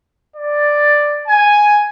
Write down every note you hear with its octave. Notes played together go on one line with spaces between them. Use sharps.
D5
G#5